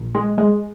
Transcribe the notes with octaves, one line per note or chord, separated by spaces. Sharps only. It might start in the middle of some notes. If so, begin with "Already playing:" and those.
Already playing: A#1
G#3
G#3